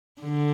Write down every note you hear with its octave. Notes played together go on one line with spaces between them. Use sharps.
D3